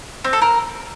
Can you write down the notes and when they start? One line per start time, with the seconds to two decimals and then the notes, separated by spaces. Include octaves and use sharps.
0.24 C4
0.33 A4
0.42 A#4